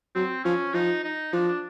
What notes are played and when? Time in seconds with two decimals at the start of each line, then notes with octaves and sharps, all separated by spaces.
0.15 F#3 C4
0.44 F3 C#4
0.74 F3 D#4
1.04 D#4
1.33 F3 D4
1.48 D4